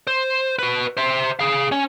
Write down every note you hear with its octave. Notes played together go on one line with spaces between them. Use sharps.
C5
F#4 B4
C5 E5
G#4 F5
C#4 C#5